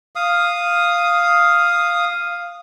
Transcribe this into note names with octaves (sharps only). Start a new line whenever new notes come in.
F5 D#6